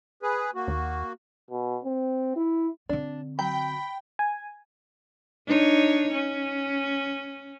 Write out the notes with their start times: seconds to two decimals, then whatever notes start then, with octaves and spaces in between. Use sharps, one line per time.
0.23 G#4 B4
0.55 A#3 F#4
0.68 D#2
1.50 B2
1.84 C4
2.36 E4
2.89 D3 C4 D4
3.39 F#3 G5 B5
4.19 G#5
5.47 D4 D#4 C#5
6.12 C#4